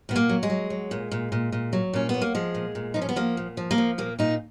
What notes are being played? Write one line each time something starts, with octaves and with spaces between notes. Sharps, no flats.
A#2 B3
A#3
F#3
G#3
F#3
F#3
A#2
A#2
A#2
A#2
F#3
A#2 C#4
F#3 B3
A#3
F3 G#3
A#2
A#2
F3 D#4
C#4
B3
F3 A#3
A#2
F3
A#3
F3
A#2 A#3
A#2 D#4